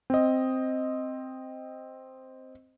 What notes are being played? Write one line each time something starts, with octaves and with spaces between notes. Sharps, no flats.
C4 D#5